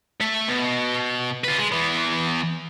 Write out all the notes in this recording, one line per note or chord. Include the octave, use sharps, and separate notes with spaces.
A3 E5
B2
F4 B4
G#3
E3 B3